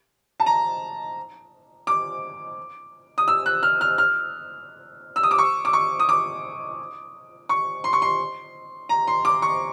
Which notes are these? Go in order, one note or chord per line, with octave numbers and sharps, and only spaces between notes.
A5
A#5
D6
D#6
E6
F#6
F6
F6
F6
E6
D#6
D6
C#6
D6
C#6
D#6
D6
C#6
C6
C#6
C6
A#5
C6
D6
C#6